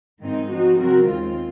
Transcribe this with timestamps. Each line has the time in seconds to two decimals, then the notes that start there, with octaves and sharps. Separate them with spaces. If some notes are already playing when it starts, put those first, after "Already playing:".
0.21 G#2 D#3 G#3 C4 D#4
0.49 F3 C4 D#4 F#4
0.78 C#3 F#3 C4 F#4 A#4
1.05 D#2 D#3 G#3 C4 F4